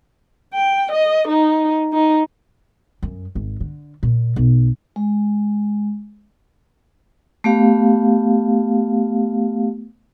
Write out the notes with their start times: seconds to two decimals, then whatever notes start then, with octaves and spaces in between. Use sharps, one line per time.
0.54 G5
0.92 D#5
1.28 D#4
1.93 D#4
3.03 F#2
3.35 G#1
3.60 D3
4.03 A#2
4.36 B1
4.96 G#3
7.44 A3 B3 G4 F5